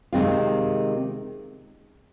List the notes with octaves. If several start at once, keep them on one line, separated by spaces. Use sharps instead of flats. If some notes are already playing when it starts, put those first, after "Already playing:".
C3 D#3 G#3 C4 F4